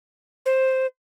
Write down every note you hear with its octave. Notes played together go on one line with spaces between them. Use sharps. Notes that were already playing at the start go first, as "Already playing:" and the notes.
C5